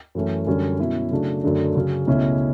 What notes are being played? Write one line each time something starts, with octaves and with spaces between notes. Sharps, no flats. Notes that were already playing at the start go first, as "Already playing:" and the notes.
F#2 E3 A3 C#4
F#2 D3 G3 C#4
B2 F#3 C#4 E4
C#3 F#3 A3 D4
F#2 D3 F#3 A3 D4
C#3 F#3 C#4
C#2 B2 A3 C#4 E4